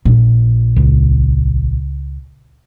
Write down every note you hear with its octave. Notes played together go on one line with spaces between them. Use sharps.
A#1
C#2